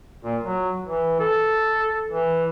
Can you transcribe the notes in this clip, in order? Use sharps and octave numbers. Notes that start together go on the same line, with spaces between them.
A#2
F#3
E3
A4
E3